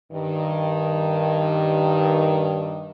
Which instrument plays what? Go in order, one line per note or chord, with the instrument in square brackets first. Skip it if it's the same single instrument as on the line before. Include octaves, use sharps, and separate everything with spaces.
[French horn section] G2 D#3